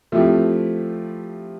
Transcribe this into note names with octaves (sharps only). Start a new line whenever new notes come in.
F3 A3 C4 E4 G4